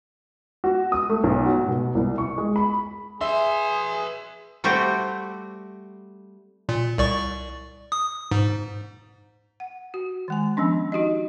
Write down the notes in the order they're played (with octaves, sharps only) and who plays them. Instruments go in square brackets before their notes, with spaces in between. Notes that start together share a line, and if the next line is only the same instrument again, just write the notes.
[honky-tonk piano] F#4
D#6
A3
B1
F#4
B2
C2
C#6
G#3
B5
[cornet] G#4 [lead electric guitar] B4 C6 [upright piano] E5
[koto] G3 A3 C4 F#4 G4
[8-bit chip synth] A#2
C2 D5 C#6
D#6
G#2
[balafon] F#5
F#4
D#3 G#3 G#5
F3 B3 C#4 D4
D#4 F#4 G4 D#5